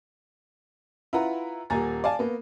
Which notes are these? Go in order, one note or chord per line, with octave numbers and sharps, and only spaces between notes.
E4 F4 B4 F#5 A#5
D#1 A#3 G#5 A#5 A6
D5 F5 G#5 A5
A#3 B3